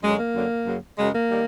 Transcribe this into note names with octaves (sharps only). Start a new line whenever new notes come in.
F#2 D3 F#3 G#3
A#3
F#2 D3 F#3
F#2 C#3 F#3
F#2 C#3 F#3 G#3
A#3
D#3 G3